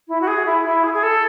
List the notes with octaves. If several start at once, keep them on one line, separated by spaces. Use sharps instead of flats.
E4
F#4
G#4
E4
E4
G#4
G#4
A4